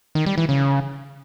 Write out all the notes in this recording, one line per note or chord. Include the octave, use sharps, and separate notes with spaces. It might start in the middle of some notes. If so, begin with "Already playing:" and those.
D#3
G3
E3
C#3